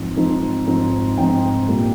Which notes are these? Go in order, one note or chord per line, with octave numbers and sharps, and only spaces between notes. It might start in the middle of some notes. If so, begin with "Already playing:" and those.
Already playing: G#2 F3 C4
G#2 F3 C4 D#4
G#2 F3 C4 D#4
G#2 F3 C4 D#4 G5
A#2 G3 A#3